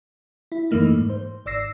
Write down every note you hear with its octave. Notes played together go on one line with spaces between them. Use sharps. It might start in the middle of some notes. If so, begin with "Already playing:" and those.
E4
F#2 E3 A3 A#3 D#4
G#2
C5
G#1 D5 D6 E6 A#6 C7